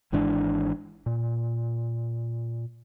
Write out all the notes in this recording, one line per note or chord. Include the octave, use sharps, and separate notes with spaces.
G#1 G#2 E3 D4
A#2